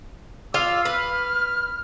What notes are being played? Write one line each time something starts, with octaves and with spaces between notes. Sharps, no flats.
F4 F5 D6 E6
B4 F6